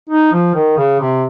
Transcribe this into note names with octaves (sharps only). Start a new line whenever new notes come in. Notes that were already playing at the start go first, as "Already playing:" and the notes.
D#4
F3
D#3
C#3
C3